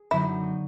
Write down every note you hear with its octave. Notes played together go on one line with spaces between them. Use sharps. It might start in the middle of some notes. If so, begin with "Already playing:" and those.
Already playing: G#4
F#2 D3 F#3 B3 D#4 E4